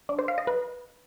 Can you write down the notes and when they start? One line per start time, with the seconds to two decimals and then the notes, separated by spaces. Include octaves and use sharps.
0.09 D4
0.19 C5
0.28 F5
0.38 D#5
0.47 B4